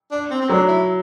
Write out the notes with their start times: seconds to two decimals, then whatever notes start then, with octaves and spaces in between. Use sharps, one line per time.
0.11 D4
0.30 C4
0.41 C4
0.49 F#3 D4
0.68 E4